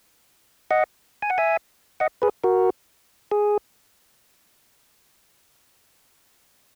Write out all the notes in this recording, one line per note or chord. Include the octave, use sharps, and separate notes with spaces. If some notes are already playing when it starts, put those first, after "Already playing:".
D#5 F#5
G#5
F#5
E5 G#5
D#5 F#5
G#4 B4
F#4 A#4
G#4